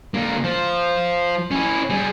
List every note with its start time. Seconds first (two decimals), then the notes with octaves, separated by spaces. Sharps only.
0.14 D3 A#3
0.44 F3
1.51 C#4 E4
1.90 G3 G#4